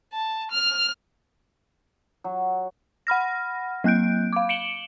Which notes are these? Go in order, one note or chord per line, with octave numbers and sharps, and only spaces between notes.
A5
F6
F#3
F#5 B5 F6 A#6
F#3 A#3 F#6 G6 D7
F5 D6
C#7 D7 E7 F#7 G7